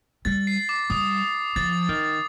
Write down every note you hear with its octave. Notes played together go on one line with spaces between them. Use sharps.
G3 A6
C7
D6
G3 D#6
F3 A6
D#3